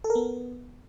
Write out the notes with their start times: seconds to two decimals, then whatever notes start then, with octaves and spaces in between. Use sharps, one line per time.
0.04 A4
0.10 A#4
0.15 B3